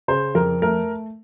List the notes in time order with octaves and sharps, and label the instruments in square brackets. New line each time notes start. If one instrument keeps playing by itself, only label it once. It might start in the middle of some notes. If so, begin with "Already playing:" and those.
[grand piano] C#3 C5
F2 A#4
A3 A#4